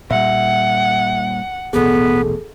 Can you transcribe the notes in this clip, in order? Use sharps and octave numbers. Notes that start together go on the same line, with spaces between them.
A#2 G3 E5 F#5
D#1 A1 B2 B3 G#4 A4